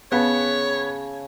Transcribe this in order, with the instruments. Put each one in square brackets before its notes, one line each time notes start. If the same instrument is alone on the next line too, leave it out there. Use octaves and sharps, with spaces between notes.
[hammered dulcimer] C#3 A5 [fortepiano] B3 [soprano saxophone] C#5